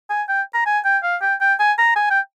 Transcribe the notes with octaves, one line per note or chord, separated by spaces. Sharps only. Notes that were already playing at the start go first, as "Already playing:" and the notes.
G#5
G5
A#5
G#5
G5
F5
G5
G5
G#5
A#5
G#5
G5